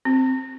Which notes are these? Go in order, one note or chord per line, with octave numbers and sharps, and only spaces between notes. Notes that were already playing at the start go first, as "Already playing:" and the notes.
C4